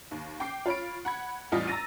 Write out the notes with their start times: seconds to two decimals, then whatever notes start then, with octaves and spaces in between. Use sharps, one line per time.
0.11 D#2
0.40 G5 D6 C7
0.66 F4 C#5 B5 D7
1.05 F#5 B5 G#6
1.52 A1 E2 G3 F4 D#5 B6
1.67 A#5 E6 A6 A#6 D#7